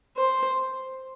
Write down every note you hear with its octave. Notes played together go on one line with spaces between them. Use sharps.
C5